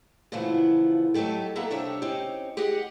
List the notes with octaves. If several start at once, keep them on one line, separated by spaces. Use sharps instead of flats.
A#2 C#3 E3 F3 A3 B3
F#3 A3 D#4 G4 A4
A#3 B3 A4 E5 A#5
C3 G3 D4 D#4 C#5 E5
C4 C#4 D#4 G4
G4 G#4 D#5 F#5